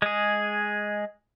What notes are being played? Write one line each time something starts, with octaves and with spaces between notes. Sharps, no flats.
G#3 G#4